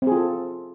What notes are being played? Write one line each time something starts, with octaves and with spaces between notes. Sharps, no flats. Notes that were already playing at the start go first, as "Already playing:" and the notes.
C4 F4 G#4 A4